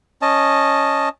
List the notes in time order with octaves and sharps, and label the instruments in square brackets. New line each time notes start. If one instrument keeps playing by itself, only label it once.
[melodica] C#4 D#5 A5